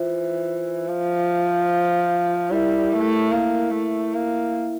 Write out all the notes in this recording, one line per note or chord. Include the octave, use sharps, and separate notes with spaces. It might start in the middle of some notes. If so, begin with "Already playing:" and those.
Already playing: E3 F4 C5 E5
F3
G3 E4 A#4 E5
A3
A#3
A3
A#3